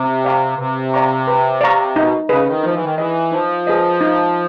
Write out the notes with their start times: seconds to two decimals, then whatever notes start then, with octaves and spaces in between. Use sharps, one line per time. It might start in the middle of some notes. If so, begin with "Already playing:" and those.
Already playing: C3
0.24 D5 F5 A#5 C#6
0.58 C3 B4
0.94 D5 F5 A#5 C#6
1.28 B4
1.61 D5 F5 A#5 C#6
1.95 B2 D#4
2.29 C#3 G#4 B4 D#5
2.47 D#3
2.63 F3 D#4
2.74 E3
2.84 D#3
2.96 E3 G#4 B4 D#5
3.32 F3 D#4
3.67 G#4 B4 D#5
4.01 D#4